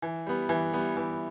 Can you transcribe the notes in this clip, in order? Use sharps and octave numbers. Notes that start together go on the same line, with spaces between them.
E3
G3 B3
E3
G3 B3
E3